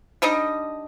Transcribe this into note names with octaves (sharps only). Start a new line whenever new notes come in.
G3 D4 D#4 D#5